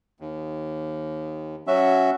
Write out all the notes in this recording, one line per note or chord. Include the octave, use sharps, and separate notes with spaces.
D#2
F#3 C#4 F#4 E5